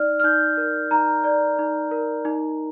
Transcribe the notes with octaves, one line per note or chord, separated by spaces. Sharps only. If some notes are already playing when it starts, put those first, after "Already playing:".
Already playing: D#4 D5 F6
F6
D#4 G6
A#4
D#4 A#5
D5
D#4
A#4
D#4